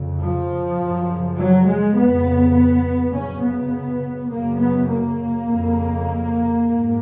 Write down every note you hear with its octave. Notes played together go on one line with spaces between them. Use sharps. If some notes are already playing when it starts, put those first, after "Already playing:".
Already playing: F2 C#3
F3
F#2 C#3
F#3
G#3
F2 C#3 B3
F#2 C#3 C#4
B3
F#2 C#3 A#3
B3
A#3
F2 C#3
G#2